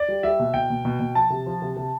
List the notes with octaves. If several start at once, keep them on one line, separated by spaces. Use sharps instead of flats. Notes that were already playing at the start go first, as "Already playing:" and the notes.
Already playing: D5
G3
G3 E5
B2
B2 G5
B2
B2
B2
F3 A5
C3
F3
C3
C3